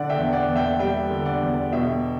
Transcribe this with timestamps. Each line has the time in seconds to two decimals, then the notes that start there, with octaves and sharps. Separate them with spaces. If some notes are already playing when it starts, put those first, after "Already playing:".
Already playing: D3 D5 F#5
0.09 E5 G5
0.18 E2
0.33 D5 F#5
0.48 E2
0.56 E5 G5
0.79 G3 E5 G5
1.11 D3
1.26 D5 F#5
1.42 E2
1.72 B2 E5 G5